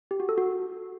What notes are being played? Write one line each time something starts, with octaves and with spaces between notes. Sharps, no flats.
G4
F#4
A4
F#4